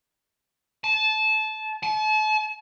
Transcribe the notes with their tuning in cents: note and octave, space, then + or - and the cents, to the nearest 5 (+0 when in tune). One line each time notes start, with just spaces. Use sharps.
A5 -20
A5 -40